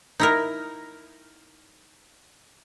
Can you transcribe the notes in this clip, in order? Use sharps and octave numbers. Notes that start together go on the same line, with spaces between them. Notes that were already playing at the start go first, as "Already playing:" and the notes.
D#4 E4 A#4